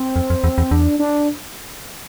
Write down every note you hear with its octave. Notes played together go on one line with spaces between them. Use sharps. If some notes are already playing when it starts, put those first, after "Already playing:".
Already playing: C4
F2
F2
E2
E2
E2 D4
D4